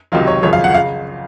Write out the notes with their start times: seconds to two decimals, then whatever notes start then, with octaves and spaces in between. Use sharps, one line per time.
0.12 C#2 C3 D#3 F#3 F4
0.27 C#5
0.43 G#1 F#2 C#3 F3 C#5
0.53 F5
0.64 F#5
0.74 C#3 F5